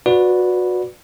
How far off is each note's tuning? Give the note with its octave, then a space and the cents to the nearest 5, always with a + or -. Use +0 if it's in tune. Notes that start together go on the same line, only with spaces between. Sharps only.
F#4 -25 B4 +0 D5 +0